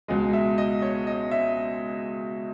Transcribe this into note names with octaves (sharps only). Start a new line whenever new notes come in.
C#2 B2 G#3 D#5
E5
D#5
C#5
D#5
E5